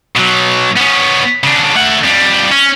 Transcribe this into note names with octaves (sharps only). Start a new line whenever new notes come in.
B2 F#3
B3 C#4
C#3 D4
A3 F#5
F2 G3
C#4